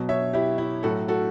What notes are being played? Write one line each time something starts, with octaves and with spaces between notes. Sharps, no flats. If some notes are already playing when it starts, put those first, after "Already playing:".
Already playing: B2 F#3
C#5 E5
E4 G4
E4
A2 F#3 F#4 A4
F#4 A4